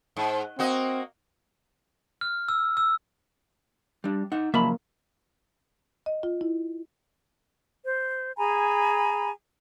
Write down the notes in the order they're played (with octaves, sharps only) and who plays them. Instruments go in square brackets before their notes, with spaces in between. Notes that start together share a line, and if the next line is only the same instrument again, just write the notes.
[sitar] G#2
[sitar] A#3 F#4 D#5 [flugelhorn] C4
[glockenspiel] F6
E6
E6
[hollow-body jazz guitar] G3 D4
D#4 F#5
[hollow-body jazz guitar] C#3 F3 F#3 [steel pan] A#3 [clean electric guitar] E5 A5 B5
[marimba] D#5
F4
E4
[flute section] C5
G#4 G#5 A#5 B5